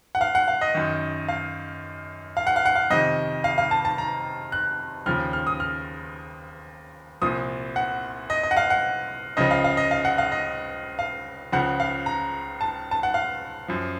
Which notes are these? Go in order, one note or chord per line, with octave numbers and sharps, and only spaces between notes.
F#5
F5
F#5
F5
D#5
F#2 D#3
F5
F5
F#5
F5
F#5
F5
F2 C3 D#3 D#5
F5
F5
A5
A5
A#5
F#6
D#2 C#3 F3 F6
F6
D#6
F6
C2 A#2 F3 D#6
F#5
D#5
D#5
F#5
F5
F#5
C#2 C#3 F3 D#5
F5
F5
D#5
F5
F#5
F5
D#5
F5
C#2 C#3 F3 F#5
F5
A#5
A5
A5
F#5
F5
F#2 F3